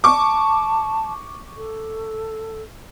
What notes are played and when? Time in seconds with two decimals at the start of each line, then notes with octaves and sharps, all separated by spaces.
0.04 A5 C#6 D6
1.57 A4